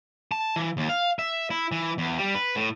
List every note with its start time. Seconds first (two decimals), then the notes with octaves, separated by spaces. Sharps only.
0.32 A5
0.56 E3
0.77 D#2
0.89 F5
1.19 E5
1.50 E4
1.72 E3
1.98 E2
2.19 G3
2.35 B4
2.56 A2